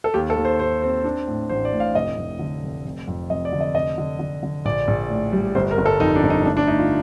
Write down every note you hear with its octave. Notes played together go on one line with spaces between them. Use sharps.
A4
D#2 G4
A4
D#2
C5
D#2 C5
C4
D4
A2
A1 C5
D5
A2
F5
F1 D#5
F1
D3
F1
F1
F2
F1 D#5
D5
D3
D#5
F1 D#5
D3
D3
D3
A#1 D5
A#1
A2
G3
G1 C5
A#4
G1
A4
F2 D#4
D4
G1
D#4
A3 D4
D4
A3 D#4
F4